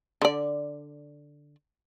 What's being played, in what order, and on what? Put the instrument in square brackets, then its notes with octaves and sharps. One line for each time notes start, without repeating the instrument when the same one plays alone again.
[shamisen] D3 D5